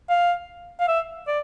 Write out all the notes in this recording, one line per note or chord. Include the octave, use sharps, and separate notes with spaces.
F5
F5
E5
D5